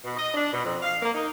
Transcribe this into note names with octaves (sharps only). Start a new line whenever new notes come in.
B2
D#5
D4
B2
F2
F5
A#3
D#4